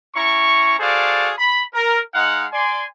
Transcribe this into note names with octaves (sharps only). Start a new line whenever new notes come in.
C#4 E4 A#5 C#6
F#4 G#4 A4 C5 D5 F5
B5
A#4
G#3 D#4 F5 F#5
D5 G#5 C6